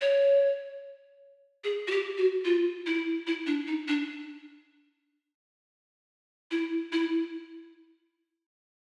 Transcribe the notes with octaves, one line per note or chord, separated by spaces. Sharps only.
C#5
G#4
F#4
G4
F#4
F4
E4
E4
D4
D#4
D4
E4
E4